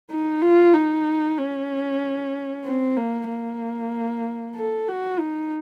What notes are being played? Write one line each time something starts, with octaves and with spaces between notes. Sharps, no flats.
D#4
F4
D#4
C#4
C4
A#3
A#3
A4
F#4
D#4